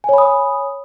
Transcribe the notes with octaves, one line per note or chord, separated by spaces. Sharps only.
C#5 G#5 B5 D#6